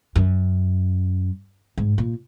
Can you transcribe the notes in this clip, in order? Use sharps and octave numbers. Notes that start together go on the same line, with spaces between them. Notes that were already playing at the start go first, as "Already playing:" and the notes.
F#2
G#2
A#2